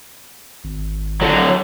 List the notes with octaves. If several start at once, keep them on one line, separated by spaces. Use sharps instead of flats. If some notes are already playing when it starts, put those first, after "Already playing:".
G#1
D3 F#3